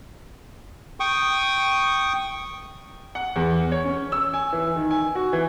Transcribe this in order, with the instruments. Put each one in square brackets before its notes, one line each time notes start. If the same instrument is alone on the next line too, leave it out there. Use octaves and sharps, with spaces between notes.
[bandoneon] G5 C#6 D#6
[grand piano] F#5
E2
C#5
C#4
E6
G#5
E3
D#3
G#5
F#4
E3